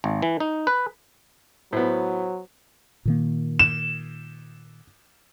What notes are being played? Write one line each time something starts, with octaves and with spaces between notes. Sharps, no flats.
G#1
E3
D#4
B4
A2 F#3 B3 C5
A#2 D#3 A#3
E7